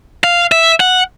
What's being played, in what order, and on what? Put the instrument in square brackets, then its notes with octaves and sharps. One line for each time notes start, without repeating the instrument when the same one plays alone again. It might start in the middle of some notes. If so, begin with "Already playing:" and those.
[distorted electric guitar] F5
E5
F#5